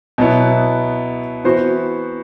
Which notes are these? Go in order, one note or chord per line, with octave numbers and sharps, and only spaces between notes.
B2 F#3 B3 E4
E3 B3 F#4 C5